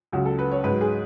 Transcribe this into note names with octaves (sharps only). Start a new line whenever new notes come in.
C#2 C#3 F#3 F#4
A4
B4
C#5
G#2 F#3 B4
G#4